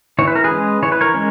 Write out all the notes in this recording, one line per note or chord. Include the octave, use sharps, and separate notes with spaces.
E3 C#5
B4
A#4
G#4 B4
G#3 C#4
E3 C#5
B4
A#4 C#5
G#3 C#4